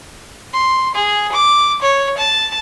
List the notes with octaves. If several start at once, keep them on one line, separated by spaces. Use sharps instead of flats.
C6
G#4
D6
C#5
A5